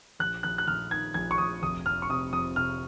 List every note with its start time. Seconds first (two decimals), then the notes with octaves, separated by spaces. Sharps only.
0.20 A#1 F#6
0.43 A#1 F#6
0.58 F#6
0.67 A#1 F6
0.91 D#3 G#6
1.14 A#1 G#6
1.31 C#6
1.38 A#1 D#6
1.62 F1 D#6
1.85 F1 F6
2.02 C#6
2.10 C3 D#6
2.33 F2 D#6
2.56 C3 F6